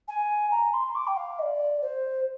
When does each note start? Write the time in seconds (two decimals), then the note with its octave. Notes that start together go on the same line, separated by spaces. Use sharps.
0.08 G#5
0.51 A#5
0.73 C6
0.95 D6
1.07 G5
1.16 F5
1.39 D#5
1.42 D5
1.82 C5